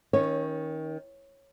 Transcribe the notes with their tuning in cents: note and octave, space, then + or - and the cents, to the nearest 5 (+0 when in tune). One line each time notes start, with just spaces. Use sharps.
D#3 +25 C#4 +0 C#5 -15